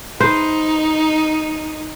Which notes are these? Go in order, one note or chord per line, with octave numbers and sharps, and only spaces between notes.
D#4 B4 C5